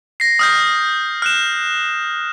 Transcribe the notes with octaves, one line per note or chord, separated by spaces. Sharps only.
A#6 C7
D#6 F6 G6
F6 F#6 E7